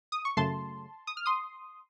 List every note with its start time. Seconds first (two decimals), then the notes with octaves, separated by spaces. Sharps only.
0.12 D#6
0.25 C#6
0.37 F#2 C#3 A3 A5 C6
1.07 D#6
1.17 F6
1.26 C6 D#6